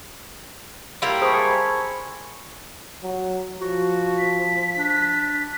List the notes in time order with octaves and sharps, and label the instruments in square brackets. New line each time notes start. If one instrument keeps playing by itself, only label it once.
[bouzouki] G3 A#3 E4 [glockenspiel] C6
[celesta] G#4 C5 D#6 [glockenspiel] A5 B5 C#6
[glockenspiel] G#5 G#6 C#7
[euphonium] F#3
[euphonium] F3 [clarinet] F#4
[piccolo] B6
[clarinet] D4